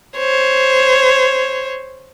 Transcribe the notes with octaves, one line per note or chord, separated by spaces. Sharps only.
C5 C#5